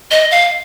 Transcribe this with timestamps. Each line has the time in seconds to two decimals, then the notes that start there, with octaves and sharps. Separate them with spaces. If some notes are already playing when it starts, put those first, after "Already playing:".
0.11 D#5
0.31 F5